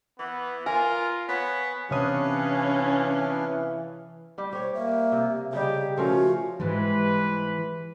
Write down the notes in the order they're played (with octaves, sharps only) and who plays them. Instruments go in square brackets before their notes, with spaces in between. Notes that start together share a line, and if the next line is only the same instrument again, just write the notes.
[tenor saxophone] E3 [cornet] B3
[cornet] F4 [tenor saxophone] A#4 [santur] G#5
[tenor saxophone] B3 [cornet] C#5
[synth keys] C3 C#5 D#6 [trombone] E3 [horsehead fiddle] C#4 [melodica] D4 B4 F5
[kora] G3 G4
[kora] G4 C#5 [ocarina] C5
[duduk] A#3 [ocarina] E5
[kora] C3
[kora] C#3 G3 D#4 [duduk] G4 [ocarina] G#4
[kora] F3 A3 A#4 [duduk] C#4 [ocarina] F#4
[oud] G#2 G3 G#3 [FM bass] E3 [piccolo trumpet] B4